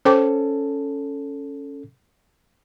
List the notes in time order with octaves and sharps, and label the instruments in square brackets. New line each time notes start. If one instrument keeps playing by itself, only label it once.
[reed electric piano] C#4 A4 [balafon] C5 G5 D6